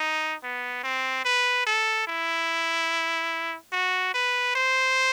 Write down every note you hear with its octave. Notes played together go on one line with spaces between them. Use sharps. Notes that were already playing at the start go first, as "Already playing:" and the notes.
Already playing: D#4
B3
C4
B4
A4
E4
F#4
B4
C5